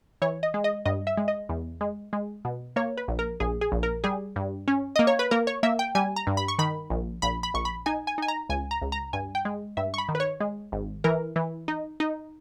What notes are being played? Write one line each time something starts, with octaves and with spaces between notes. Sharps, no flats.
E3 C#5
D#5
G#3
D#5
G2 D#5
E5
G#3
D#5
E2
G#3
G#3
B2
A#3 C#5
B4
A#1
A#4
A#1 G#4
G#4
A#1
A#4
G3 G#4
G2
C#4
A#3 D#5
C#5
B4
A#3 A#4
C#5
A#3 E5
G5
G3 G#5
A#5
G2
B5
C#6
D#3 B5
A#1
A#1 B5
B5
A#1 C#6
B5
D#4 G#5
G#5
D#4 G#5
A#5
C#2 G#5
A#5
C#2
A#5
G2 G#5
G5
G#3
G2 E5
C#6
B5
D#3
B4
C#5
G#3
G#1
E3 A#4
E3
D#4
D#4